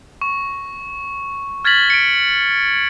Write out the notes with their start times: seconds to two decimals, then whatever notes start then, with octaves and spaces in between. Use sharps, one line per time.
0.21 C#6
1.65 F6 G#6 A6 B6 F#7
1.90 C#7 D7